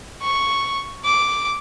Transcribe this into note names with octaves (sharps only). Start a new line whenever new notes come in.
C#6
D6